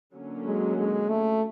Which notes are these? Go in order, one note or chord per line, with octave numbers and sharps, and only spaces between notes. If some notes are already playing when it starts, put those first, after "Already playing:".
D3 F#3 A#3 C#4
G#3
G#3
A3